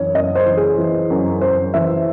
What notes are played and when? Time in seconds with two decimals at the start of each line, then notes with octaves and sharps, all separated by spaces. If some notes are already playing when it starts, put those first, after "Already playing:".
Already playing: F#2 E3 C#5
0.14 F#2 D#5
0.35 C5
0.46 E3
0.57 G#4
0.78 E3
1.10 F#2
1.41 F#2 C5
1.74 E3 E5